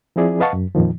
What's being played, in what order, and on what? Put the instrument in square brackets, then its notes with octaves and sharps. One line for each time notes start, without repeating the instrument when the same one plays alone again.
[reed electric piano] F3 C4 E4 G#4 D5
B4 D#5 F5 F#5 A5 C#6
F#2
F2 A#2 D#3 F3